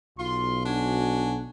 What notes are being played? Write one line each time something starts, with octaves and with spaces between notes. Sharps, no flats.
B1 F4 C6
D4 F#4 G#5